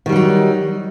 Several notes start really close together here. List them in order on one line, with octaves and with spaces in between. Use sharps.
D#3 G3 F#3 D#4